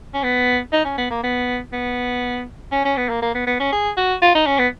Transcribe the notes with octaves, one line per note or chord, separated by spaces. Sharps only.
C#4
B3
D#4
C#4
B3
A#3
B3
B3
C#4
C#4
B3
A#3
A#3
B3
B3
C#4
G#4
F#4
F4
D#4
C#4
B3